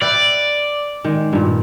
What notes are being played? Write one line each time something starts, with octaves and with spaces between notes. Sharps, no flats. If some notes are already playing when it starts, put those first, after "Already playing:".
B4 D5 E5 G5
D#3 G#3
G2 A#2